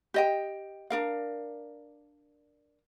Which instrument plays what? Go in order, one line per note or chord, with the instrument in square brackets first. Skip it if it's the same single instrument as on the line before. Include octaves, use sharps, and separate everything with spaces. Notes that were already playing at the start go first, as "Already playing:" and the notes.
[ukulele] G4 D#5 G5
D4 A#4 F5